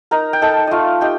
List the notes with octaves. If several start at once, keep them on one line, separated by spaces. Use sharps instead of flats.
D#4 A#4 A#5
G5
D#4 A4 A5
A3 F4 D#5 F5
D#4 G4 G5